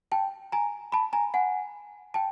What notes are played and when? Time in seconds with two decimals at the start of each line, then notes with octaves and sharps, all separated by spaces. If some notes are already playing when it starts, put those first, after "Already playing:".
0.12 G5 A5
0.52 G#5 A#5
0.92 A5 B5
1.13 G#5 A#5
1.34 F#5 G#5
2.14 G5 A5